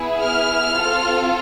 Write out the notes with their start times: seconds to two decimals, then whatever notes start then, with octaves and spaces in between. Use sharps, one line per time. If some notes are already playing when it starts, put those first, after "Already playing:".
Already playing: B3 E4 G#4
0.21 F6
0.74 C4 F4 A4